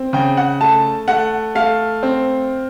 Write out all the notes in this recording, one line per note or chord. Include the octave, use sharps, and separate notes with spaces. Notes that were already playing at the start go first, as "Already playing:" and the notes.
Already playing: C4
C#3 G5
F#5
A3 A5
A3 F#5
A3 F5
C4